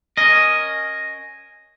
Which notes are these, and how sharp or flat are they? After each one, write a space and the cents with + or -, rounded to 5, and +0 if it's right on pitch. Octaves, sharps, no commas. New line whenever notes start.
C#4 +0 A#4 +0 D#5 +0